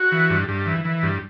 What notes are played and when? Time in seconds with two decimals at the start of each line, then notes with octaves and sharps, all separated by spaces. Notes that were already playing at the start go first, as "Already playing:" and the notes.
Already playing: F#4
0.12 E3
0.30 G2
0.48 G2
0.66 E3
0.85 E3
1.03 G2